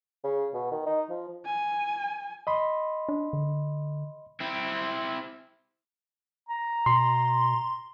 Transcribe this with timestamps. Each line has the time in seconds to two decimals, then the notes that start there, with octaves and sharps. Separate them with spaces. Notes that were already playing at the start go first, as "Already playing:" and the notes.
0.24 C#3
0.54 B2
0.72 D#3
0.86 D#4
1.10 F3
1.45 G#5
2.47 D#5 B5 C6
3.09 D4
3.33 D3
4.40 C4 E4
6.49 A#5
6.86 B2 C6